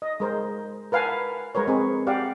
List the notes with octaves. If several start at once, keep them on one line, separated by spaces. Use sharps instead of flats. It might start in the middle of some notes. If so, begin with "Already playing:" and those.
D#5
G#3 A#4 C5
A#4 B4 F5 F#5 G#5 A5
G#3 A#4 B4 C#5
C4 G#4
G4 D5 F5 F#5